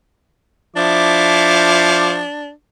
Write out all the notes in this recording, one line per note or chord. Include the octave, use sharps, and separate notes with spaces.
F3 D4 E4 D6